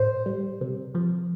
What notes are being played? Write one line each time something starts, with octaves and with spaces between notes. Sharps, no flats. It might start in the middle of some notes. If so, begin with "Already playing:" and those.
Already playing: A2 C5
G3
C3
F3